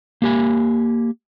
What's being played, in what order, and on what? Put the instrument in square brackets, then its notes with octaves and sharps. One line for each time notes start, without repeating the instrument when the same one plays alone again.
[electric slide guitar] A#3 G4 G#5